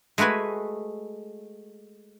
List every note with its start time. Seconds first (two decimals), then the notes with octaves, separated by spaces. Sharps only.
0.18 G#3 A3 F#4 B4 G#5